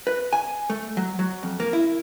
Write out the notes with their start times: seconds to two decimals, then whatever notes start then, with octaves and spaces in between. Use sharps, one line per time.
0.07 B4
0.33 G#5
0.70 A3
0.97 F#3
1.19 F#3
1.43 F2
1.60 A#3
1.73 E4